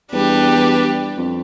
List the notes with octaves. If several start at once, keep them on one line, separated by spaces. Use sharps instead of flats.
E2 G3 D4 G4 B4
F2